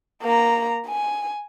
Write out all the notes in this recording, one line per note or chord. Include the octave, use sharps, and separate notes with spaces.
A#3 A#5
G#5